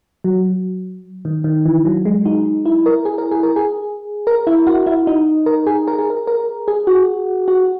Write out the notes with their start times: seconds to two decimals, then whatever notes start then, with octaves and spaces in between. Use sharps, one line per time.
0.24 F#3
1.25 D#3
1.44 D#3
1.66 E3
1.85 F#3
2.05 G#3
2.25 D#4
2.65 E4
2.86 A#4
3.05 G#4
3.18 A#4
3.31 G#4
3.43 A#4
3.56 G#4
4.27 A#4
4.47 E4
4.67 F#4
4.86 E4
5.07 D#4
5.46 A#4
5.66 G#4
5.87 A#4
5.99 G#4
6.10 A#4
6.27 A#4
6.68 G#4
6.87 F#4
7.48 F#4